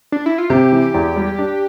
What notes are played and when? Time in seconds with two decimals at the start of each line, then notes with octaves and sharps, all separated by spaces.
0.12 D4
0.26 E4
0.38 F4
0.50 C3 G4
0.72 E3
0.94 E2
1.16 G3
1.39 D4